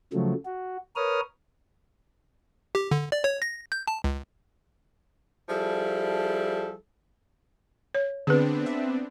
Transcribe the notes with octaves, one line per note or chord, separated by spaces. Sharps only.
C#3 F3 F#3 A3
F#4
A#4 B4 C#5 D#6 F6
G4
D3
D5
C#5
A#6
G6
A5
C#2
F3 G3 E4 G#4 A4
C#5
D3 B3 C4 D4 G#4 B4
E5